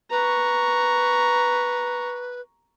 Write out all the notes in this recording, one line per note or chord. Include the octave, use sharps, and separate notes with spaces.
B4 A#5 C#6